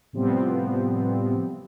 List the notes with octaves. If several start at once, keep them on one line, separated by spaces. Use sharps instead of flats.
A2 C3 F3 G3 B3 C4